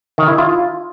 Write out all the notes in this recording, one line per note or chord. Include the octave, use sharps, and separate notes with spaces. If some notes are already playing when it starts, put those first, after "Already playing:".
D#3
E4
F4